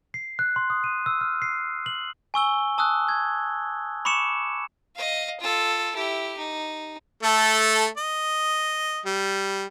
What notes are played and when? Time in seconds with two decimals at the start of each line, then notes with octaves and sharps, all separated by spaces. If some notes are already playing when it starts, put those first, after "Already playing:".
0.14 C7
0.39 F#6
0.56 C6
0.70 D#6
0.84 D#7
1.06 E6
1.21 F6
1.42 C7
1.86 F#7
2.34 G#5 C#6 E6 G7
2.78 A5 D#6 E6 F#6
3.09 G#6
4.05 B5 C#6 D6 C#7 E7
4.95 D#5 F5
5.40 F4 A4
5.95 E4 G4
6.38 D#4
7.23 A3 A4
7.97 D#5
9.06 G3